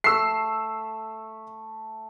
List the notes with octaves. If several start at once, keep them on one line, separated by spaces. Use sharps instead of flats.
A3 E6 C7